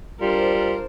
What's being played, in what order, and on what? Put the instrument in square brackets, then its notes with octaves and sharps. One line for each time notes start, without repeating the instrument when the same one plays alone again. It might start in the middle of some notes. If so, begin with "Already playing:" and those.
[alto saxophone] G3 [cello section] D4 C5 [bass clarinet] F4 [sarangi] A#4